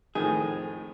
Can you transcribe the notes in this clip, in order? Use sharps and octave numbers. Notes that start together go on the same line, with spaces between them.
F2 A2 D#3 G#4